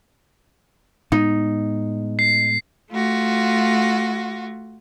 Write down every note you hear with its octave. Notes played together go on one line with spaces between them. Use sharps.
A2 G#3 B3 D#4
C7
A3 F4 F#4